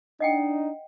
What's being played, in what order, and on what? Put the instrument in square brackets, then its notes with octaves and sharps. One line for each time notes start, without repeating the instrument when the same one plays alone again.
[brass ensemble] D4 D#4 [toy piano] D#5 F#5 G5